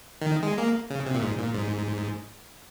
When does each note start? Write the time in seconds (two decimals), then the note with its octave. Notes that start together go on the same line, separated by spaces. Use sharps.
0.21 D#3
0.42 G#3
0.58 A#3
0.90 C#3
1.06 C3
1.15 A#2
1.22 G#2
1.38 A#2
1.53 G#2